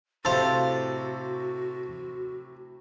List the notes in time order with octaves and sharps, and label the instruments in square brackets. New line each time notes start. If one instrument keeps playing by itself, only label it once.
[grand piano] A2 C3 [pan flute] F#4 [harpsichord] A4 C5 [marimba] F5 A6